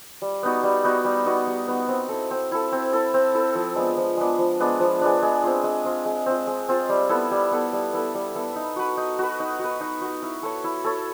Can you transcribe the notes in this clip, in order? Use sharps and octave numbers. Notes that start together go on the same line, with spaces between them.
G3
B3 D#4 F#4
G3
B3 D#4 F#4
G3
B3 D#4 F#4
G3
B3 D#4 F#4
C4
E4 A4
C4
E4 A4
C4
E4 A4
C4
E4 A4
F3
G#3 B3 D4
F3
G#3 B3 D4
F3
G#3 B3 D4
F3
G#3 B3 D4
G#3
C4 F4
G#3
C4 F4
G#3
C4 F4
G#3
C4 F4
G3
B3 E4 A4
G3
B3 E4 A4
G3
B3 E4 A4
G3
B3 E4 A4
D#4
F#4 B4
D#4
F#4 B4
D#4
F#4 B4
D#4
F#4 B4
E4
A4 C#5
E4
A4 C#5